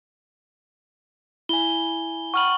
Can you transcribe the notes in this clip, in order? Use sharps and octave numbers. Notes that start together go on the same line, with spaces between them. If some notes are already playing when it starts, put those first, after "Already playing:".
E4 G#5 G7
F#5 G5 B5 C#6 F6 F#7